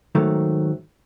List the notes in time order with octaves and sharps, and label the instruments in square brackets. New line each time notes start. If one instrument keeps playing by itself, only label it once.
[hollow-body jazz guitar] G#2 D#3 F#3 A3